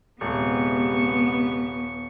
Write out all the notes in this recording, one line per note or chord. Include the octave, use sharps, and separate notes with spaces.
D#1 C3 G#3 B3 G4 C#6